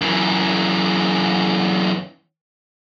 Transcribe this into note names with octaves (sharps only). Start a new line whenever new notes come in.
F#2 E3